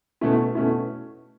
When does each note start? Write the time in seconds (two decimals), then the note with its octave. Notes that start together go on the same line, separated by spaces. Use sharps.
0.21 B2 A3 C#4 E4
0.55 B2 A3 C#4 E4